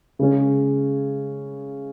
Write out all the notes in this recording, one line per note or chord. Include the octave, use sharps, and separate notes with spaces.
C#3 G#3 C#4